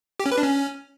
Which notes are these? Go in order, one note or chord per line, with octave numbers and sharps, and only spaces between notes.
G4
C#4
B4
D4
C#4